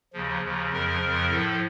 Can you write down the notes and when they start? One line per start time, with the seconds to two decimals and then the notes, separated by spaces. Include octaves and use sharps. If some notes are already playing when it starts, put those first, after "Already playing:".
0.13 D#2 C#3 F3
0.43 D#2 C#3 F3
0.72 F2 C#3 F3 A#4
1.01 F2 C#3 F3
1.31 A2 F3 A4